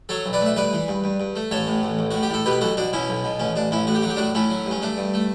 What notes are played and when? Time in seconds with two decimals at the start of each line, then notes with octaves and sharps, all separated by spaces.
0.09 F#3 A4 C#5
0.26 B1
0.33 B4 D5
0.41 A3
0.46 E5
0.56 G2 B4 D5
0.73 E3
0.88 G2
1.04 G2
1.20 G2
1.36 A3
1.51 A1 A4 C#5
1.67 A2
1.83 A1
1.99 A1
2.11 A2 F#4
2.23 G4
2.30 A2 A4
2.45 B2 G4 B4
2.61 B1 F#4 A4
2.77 B2 D4 F#4
2.93 B2 C#4 E4
3.09 B1
3.24 B2
3.40 A1 C#4
3.56 A1 D4
3.71 A1 C#4 E4
3.87 A2 F#4
3.95 G4
4.02 F#3 F#4
4.10 G4
4.16 A2 D4 F#4
4.35 A3 C#4 E4
4.50 F#3
4.66 G2 C#4
4.82 A3 D4
4.97 G2
5.14 A3